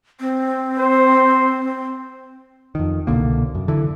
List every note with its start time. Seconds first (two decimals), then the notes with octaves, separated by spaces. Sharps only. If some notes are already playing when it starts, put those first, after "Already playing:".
0.20 C4
0.78 C5
2.75 F2 D#3
3.07 C2 B2 D3 A#3
3.55 F#2
3.68 D3 E3